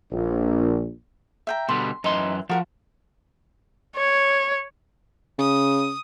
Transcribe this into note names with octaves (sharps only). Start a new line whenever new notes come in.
A#1
E5 G5 A#5
B2 D3 G3 C6
F#2 E3 D#4 C6
F3 F#4 A#4 F#5
C#5
C#3 D#6